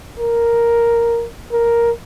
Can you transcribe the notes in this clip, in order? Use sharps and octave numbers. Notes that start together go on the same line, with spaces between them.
A#4
A#4